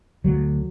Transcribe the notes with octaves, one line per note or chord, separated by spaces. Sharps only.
D2 F#3